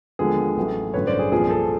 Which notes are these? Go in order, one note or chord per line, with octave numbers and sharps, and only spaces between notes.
D#2 D3 F3 G#3 B3 G#4
A1 A2 F#3 A3
A1 G2 D3 F#3 B4 C#5
C5 D5
G#4
C2 A#2 F3 G#4
A4